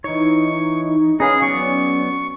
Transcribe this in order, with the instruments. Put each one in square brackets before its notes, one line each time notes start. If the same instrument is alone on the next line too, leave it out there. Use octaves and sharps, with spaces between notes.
[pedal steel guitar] E3 C#5 [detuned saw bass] D#4 [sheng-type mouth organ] C#6
[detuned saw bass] C#4 [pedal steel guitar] D#4 B4 F5 [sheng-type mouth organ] G#4
[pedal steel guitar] F#3 B3 D5 [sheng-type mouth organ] C#6